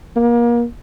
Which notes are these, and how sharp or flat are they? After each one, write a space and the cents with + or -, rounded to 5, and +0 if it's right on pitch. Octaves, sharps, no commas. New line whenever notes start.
A#3 +30